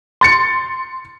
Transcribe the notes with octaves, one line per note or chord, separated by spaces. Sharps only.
C6 A6 C#7